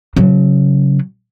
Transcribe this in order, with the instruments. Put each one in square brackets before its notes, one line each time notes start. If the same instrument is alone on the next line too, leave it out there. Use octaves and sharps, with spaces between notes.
[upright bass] C#3 F#3